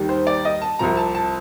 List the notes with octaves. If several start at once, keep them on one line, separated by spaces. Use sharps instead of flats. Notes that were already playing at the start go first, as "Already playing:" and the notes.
Already playing: D#2 D#3 G3
C5
D5
D#5
A5
C2 C3 F3 A#5
A5
A5